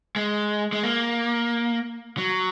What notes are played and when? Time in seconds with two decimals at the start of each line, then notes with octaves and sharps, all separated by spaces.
0.16 G#3
0.73 G#3
0.83 A#3
2.18 F#3